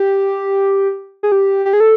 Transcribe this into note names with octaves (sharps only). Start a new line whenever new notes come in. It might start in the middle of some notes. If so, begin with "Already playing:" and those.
Already playing: G4
G#4
G4
G4
G#4
A4